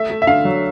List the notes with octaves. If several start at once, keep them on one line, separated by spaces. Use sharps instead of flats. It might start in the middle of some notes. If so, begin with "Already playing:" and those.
Already playing: A3 E5
A3
E5
D3 F5
F#3